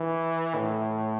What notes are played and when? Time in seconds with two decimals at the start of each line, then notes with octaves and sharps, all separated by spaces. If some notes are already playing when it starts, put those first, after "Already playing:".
Already playing: E3
0.55 A2